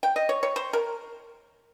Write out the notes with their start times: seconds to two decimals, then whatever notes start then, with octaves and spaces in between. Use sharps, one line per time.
0.03 G5
0.16 D#5
0.29 C#5
0.43 C#5
0.56 C5
0.73 A#4